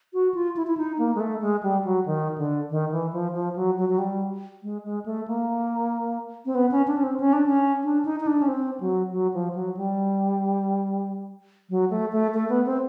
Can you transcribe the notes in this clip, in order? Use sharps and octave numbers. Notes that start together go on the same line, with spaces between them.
F#4
F4
E4
E4
D#4
A#3
G#3
A3
G#3
G3
F#3
D#3
D3
D#3
E3
F3
F3
F#3
F#3
F#3
G3
G#3
G#3
A3
A#3
C4
B3
C#4
D4
C#4
C4
C#4
D4
C#4
D4
D#4
D#4
D4
C#4
C4
F#3
F#3
F3
F#3
G3
F#3
A3
A3
A3
B3
C4